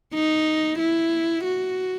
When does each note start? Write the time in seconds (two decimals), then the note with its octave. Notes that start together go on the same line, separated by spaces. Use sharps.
0.14 D#4
0.79 E4
1.45 F#4